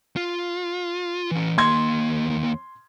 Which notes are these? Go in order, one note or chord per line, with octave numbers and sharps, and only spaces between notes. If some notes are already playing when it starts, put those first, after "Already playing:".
F4
E3 C#4
D#2 A#3 C6 G#6